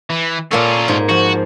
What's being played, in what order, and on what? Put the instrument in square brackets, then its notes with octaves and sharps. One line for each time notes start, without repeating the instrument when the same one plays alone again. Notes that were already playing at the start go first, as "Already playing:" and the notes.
[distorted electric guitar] E3
[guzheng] A#2 A#3 A4 [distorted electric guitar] C#4 F4
[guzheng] G#2
[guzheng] F3 [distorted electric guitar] F#4